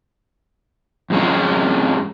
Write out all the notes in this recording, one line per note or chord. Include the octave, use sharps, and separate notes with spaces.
F2 G#3 C#4